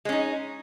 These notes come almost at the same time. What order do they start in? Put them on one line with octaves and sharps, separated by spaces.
G#3 C#4 D#4